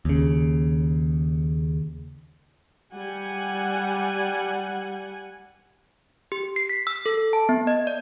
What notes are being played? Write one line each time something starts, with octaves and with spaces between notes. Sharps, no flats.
D#2 C#3
G3 F#5 G#5
G4
C7
B6
E6
A4
A5
B3
D#5
D5